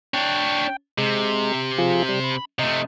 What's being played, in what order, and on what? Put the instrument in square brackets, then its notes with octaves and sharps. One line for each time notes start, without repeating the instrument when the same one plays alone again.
[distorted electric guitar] D4 C#5 [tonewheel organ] G5
[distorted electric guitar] C3 [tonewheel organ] G#3
[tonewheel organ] F3 F4 G#4
G3
B5
[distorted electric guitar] C3 A3 [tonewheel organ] D#5